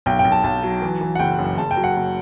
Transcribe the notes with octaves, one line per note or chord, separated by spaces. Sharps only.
B1 G5
G5
B1
A5
B1 A5
F#3
E3
E3
F#5
F#1 G5
F#2
F#1 A5
G5
F#3
F#5
F#1